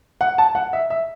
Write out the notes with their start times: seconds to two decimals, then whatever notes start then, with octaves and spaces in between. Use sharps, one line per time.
0.21 F#5
0.38 A5
0.55 F#5
0.73 E5
0.90 E5